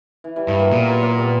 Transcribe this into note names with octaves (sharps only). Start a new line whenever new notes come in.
E3
E3 G3
G2 E3 G3
F#3 A#3
A#2 G3 B3
F#3 A#3
F#3 A#3
G3 B3